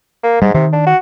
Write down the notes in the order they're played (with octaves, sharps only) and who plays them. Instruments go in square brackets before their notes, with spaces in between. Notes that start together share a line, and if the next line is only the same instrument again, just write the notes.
[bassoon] A#3
[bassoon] G#2 [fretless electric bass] G3
[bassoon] C3 [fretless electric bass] D#3
[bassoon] D4
F#4